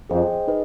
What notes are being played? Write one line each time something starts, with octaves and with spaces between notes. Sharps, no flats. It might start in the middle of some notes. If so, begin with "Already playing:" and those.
F2 G#4 C5 D#5 G5
D#4 G#4 B4 D#5